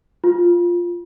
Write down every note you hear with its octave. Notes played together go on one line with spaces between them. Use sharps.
F4